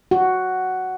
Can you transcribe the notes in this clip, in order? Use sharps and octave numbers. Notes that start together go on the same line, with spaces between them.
F#4